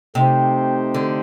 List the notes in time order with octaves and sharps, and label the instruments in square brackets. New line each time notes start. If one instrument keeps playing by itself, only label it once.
[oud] C3 [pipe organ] A3 D#4 G4 C5
[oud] D3